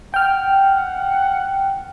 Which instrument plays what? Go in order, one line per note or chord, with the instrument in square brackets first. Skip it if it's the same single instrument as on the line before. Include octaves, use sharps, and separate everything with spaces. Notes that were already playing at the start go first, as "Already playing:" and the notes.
[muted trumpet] F#5 [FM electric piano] G5 F6